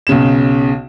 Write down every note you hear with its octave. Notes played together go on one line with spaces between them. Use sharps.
B1 C#3 E7